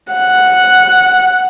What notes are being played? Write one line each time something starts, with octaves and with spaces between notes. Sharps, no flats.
F#5